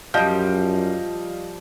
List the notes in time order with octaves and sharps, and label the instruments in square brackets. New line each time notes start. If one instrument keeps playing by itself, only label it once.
[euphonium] F#2 [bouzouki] F3 G3 [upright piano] D#5 F5 G6